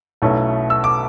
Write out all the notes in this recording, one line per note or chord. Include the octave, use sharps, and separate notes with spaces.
B1 B2 A3 C#4 E4
E6
D6